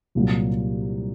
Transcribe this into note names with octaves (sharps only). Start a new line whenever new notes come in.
C2 A#2 F#3